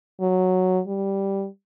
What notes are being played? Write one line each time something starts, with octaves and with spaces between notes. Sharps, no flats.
F#3
G3